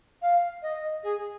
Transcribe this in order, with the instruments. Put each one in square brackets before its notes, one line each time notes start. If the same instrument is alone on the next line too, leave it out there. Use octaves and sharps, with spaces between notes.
[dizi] F5
D#5
G#4